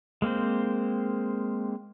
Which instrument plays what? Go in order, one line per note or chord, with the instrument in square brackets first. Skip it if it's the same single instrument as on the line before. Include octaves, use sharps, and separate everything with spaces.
[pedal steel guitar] G#3 A#3 C4 C5